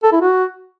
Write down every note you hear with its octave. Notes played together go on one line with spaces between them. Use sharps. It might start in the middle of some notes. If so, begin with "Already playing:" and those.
A4
E4
F#4